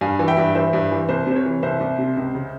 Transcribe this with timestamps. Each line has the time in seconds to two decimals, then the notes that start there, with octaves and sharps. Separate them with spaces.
0.01 G2 F5 G#5
0.19 E3
0.28 E5 G5
0.37 G2
0.55 E3 C5 E5
0.73 G2
0.91 E3
1.09 C2 C5
1.26 C3 C5
1.36 C#5
1.45 E3
1.63 C2 C5 E5
1.80 C2
1.98 C3
2.17 C#2
2.35 C#3